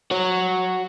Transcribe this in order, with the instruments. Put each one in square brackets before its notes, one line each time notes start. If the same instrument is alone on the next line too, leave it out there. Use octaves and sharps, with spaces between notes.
[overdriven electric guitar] F#4 C#5